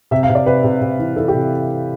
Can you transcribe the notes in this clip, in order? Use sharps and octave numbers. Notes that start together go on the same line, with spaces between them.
C3 E5
F5
C3
D5
C3 B4
C3
C3
E3
E3 A4
G4
C3